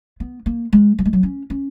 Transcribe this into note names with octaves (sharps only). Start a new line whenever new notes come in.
B3
A#3
G#3
F#3
G#3
F#3
C#4
C#4